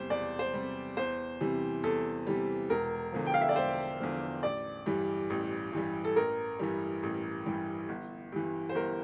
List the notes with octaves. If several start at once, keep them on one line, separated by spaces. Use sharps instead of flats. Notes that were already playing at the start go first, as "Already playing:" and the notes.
Already playing: E2 C3 G3 C5
E2 D5
C5
C3 G3
E2 C5
C3 E3 G3
E2 A4
C3 E3 G3
E1 A#4
E2 D3 F3
G5
F5
E5
D5
E1 C5
E2 D3 F3
A1 D5
G2 E3 G3
A1
G2 E3 G3
A4
A1 A#4
G2 E3 G3
A1
G2 E3 G3
G1
G2 E3
C5
G1 A#4